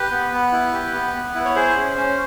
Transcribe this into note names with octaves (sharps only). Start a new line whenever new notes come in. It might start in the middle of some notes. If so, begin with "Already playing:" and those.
Already playing: G4 B4
B3
B3
E4
G4
B3
B3
E4
C#5
G#4 C5
C#4
C#4